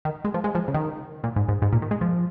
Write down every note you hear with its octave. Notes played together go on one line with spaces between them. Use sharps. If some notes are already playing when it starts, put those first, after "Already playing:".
D#3
G#3
F3
G#3
F3
C#3
D#3
A#2
G#2
G#2
G#2
A#2
D#3
G#3
F3